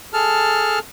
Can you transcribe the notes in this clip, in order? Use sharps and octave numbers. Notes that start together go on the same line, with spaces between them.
G#4 A4 A5 F6